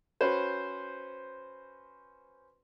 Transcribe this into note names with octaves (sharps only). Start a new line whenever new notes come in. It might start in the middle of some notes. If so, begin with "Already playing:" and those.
C#4 F#4 B4 C5